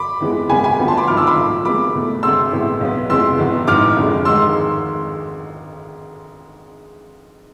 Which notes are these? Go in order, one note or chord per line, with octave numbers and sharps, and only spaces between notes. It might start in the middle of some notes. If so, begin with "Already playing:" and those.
Already playing: B5 D6
F2 E3 G#3 B3
C2 B2 G#3 B3 G#5 B5
G#5 B5
D2 D3 F3 B3
A5 C6
B5 D6
G#1 G#2 F3 D6 F6
C6 E6
B5 D6
B1 A2 F3
G#1 G#2 G#3 B3 B5 D6
E2 B2 A3
D2 C3 G#3 C6 E6
A1 A2 G#3 B3
B1 B2 B3
F2 C3 E3 G#3 B3 C6 E6
F1 E2 B2 B3
A1 G#2 E3 D6 F6
F1 F2 D3 G#3
G#1 G#2 G#3 C6 E6